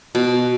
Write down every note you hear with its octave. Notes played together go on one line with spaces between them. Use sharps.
B2